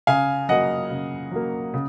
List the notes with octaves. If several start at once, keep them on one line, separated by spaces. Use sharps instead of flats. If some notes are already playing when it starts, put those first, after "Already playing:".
C#3 F5 G#5
F#3 A#3 D#5 F#5
C#3
F#3 A#3
C#3